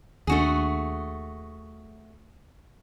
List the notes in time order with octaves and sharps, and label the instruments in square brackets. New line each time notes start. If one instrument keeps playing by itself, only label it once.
[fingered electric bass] D#2 D4 [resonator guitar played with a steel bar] A3 F#4 G#4